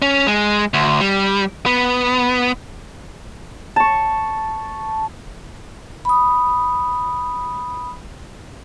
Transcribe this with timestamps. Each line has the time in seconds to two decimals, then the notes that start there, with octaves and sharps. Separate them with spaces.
0.02 C#4
0.27 G#3
0.74 D2
1.01 G3
1.66 B3
3.76 A5 C#6
6.05 B5 D#6